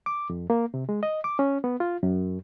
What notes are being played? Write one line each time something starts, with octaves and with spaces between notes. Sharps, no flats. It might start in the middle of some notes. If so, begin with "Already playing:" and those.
D6
F2
A#3
C3
G#3
D#5
D6
C#4
B3
F4
F#2